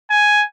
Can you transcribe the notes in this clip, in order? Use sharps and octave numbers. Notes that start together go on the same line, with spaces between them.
G#5